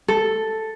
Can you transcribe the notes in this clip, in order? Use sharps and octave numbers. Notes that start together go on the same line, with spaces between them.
A4